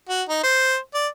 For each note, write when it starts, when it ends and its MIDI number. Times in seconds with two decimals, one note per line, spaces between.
0.09 0.22 66
0.29 0.40 63
0.43 0.76 72
0.94 1.08 74